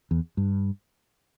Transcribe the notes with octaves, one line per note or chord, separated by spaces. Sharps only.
E2
G2